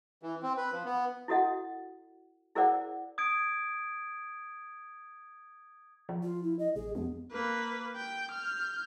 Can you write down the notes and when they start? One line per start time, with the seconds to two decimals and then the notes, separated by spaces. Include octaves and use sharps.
0.23 E3
0.43 C4
0.57 B4
0.72 F3
0.85 B3
1.28 E4 F#4 A4 D#5 F#5
2.55 E4 G#4 A#4 C5 D5 F#5
3.18 D#6 G#6 D7
6.09 F3
6.23 F4
6.43 E4
6.59 D#5
6.76 A1 G#4
6.95 F2 B3
7.32 A#3 B4
7.96 G5
8.31 F6 G6